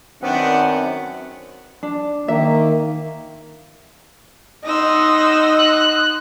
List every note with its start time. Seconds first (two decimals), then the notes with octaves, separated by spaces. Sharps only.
0.23 F#2 D#3 B3 C4 D4 F#5
1.83 D4
2.28 D#3 A#3 E5
4.65 D#4 F#5 C6 D#6 E6 A#6
5.59 F#6